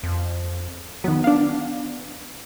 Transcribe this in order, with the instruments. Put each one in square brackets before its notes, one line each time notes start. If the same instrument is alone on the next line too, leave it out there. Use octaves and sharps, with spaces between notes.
[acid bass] F2
[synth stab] D#3 F#3 [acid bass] B3
[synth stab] D4 F5